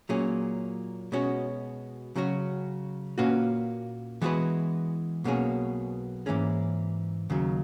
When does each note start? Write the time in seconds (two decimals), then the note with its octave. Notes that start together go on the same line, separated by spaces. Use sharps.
0.09 A#2 F#3 C#4 G#4
1.12 B2 G#3 C#4 F#4
2.16 C#3 F#3 C#4 F#4
3.18 A#2 A#3 C#4 F#4 B4
4.21 E3 G#3 B3 F#4 B4
5.24 B1 B2 A#3 C#4 G#4
6.26 G#2 E3 A#3 C#4 G#4
7.30 D#2 C#3 F#3